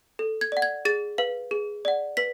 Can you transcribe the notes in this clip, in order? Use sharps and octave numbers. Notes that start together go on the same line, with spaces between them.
A4
G#6
D5 F#5
G#6
G#4 A6
B4 F5
G#4
D5 F#5
B4 B6